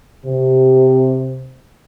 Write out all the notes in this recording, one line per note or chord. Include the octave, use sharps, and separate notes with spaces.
C3